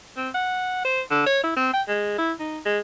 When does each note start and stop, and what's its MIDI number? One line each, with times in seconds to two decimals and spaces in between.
0.17 0.29 60
0.35 0.81 78
0.85 1.01 72
1.11 1.25 50
1.26 1.41 73
1.44 1.52 64
1.56 1.70 60
1.74 1.82 79
1.88 2.13 56
2.18 2.32 64
2.40 2.58 63
2.65 2.79 56